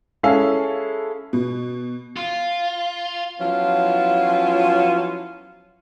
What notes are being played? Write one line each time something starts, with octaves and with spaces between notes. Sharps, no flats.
G#3 C#4 E4 G#4 A4 F5
B2
F4
F3 F#3 B3 C#4 E4 F4